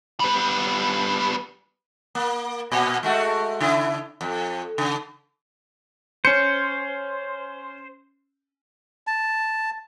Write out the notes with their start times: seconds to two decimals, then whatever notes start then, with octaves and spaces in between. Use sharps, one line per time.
0.20 G3 B3
2.15 A#3
2.72 A#2
3.03 G#3 A3 F#4
3.60 C#3 E4
4.21 F2
4.78 C#3
6.25 C#4 C5 C#7
9.07 A5